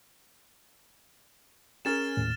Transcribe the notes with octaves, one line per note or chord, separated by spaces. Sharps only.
C#4 G#4 A#4 F6 A6 E7
D#2 A2